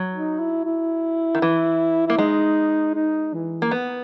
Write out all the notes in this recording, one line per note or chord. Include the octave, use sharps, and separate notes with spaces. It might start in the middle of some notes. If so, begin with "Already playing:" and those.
Already playing: F#3
D#4
E4
E4
D#3
E3
A#3 E4
G#3 D#4
D#4
E3
A#3
B3